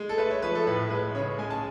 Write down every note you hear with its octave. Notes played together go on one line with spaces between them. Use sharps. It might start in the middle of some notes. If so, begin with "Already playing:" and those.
Already playing: G#3
A4
A3 B4
C#5
F3 B4
A4
A2 B4
G#3 B4
C#3 C#5
G#3 G#5
A5